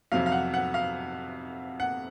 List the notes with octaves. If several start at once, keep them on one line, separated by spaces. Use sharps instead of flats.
F2 C3 F#3 F5
F5
F#5
F#5
F5
F#5